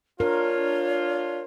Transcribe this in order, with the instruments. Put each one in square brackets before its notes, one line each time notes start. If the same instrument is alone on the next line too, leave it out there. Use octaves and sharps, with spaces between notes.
[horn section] D4 F4 [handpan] A#4 [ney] C#5